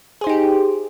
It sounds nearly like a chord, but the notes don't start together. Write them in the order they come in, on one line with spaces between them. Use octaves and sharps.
G#4 C5 D#4 G4